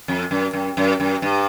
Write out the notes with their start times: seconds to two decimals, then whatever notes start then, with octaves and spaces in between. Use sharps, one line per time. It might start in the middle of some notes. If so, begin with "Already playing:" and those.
0.08 F2
0.31 F#2
0.53 F#2
0.77 F#2
1.00 F#2
1.22 G2